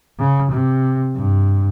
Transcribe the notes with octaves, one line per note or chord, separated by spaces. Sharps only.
C#3
C3
G2